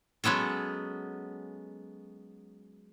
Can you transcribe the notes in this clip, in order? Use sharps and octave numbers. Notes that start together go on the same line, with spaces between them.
F#3 G#3 B3 C#4 A4